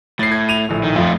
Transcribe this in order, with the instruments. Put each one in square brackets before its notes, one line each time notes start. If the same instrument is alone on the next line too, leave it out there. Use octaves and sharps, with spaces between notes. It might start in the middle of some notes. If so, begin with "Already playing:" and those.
[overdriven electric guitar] A2 [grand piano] A6 C7
[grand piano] G#6
D#7 F7
A#1 A2
[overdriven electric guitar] D#3
[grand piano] F2 [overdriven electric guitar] A3 F4